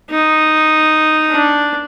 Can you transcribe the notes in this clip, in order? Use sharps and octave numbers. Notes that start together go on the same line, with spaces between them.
D#4
D4